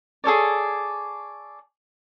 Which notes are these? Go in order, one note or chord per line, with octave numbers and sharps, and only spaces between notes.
G#4 A4 C#5 D5